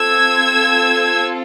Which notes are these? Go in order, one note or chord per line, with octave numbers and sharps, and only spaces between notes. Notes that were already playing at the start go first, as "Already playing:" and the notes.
Already playing: C4 F4 A4 E6 G#6